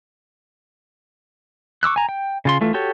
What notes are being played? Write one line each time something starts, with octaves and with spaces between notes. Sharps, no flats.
C#6 D6 E6 F#6
G#5 A#5
G5
C#3 F4 C6
E3 A3 F4
F#4 G4 A4 C#5